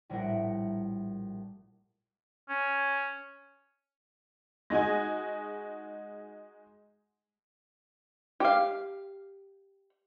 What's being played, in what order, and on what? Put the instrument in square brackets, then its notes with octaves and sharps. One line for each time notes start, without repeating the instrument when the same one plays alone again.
[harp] A#1 A2 G3 E4 A#4 F#5
[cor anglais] C#4
[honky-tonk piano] G#3 D#4 F#4 G#5
[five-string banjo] G4 F5